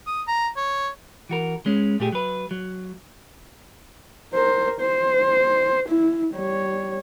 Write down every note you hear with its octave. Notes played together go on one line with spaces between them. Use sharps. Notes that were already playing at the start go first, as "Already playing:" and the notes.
D#6
A#5
C#5
E3 F#4 A#4
G#3 C#4
A#2 A3 G4 G#4
F#3 B4
F#3
A#4 C5
C5
E4
G3 C#5